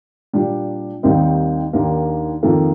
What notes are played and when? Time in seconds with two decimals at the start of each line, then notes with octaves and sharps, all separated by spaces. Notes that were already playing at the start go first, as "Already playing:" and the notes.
0.33 A#2 G3 D4
1.03 D#2 D#3 G3 C4 D#4
1.73 D#2 D#3 A#3 D4
2.43 F2 D#3 A#3 F4 A4